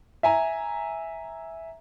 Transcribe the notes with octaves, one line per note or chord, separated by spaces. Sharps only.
E5 G#5 A#5